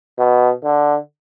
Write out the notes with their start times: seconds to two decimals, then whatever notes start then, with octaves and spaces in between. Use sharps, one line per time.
0.18 B2
0.64 D3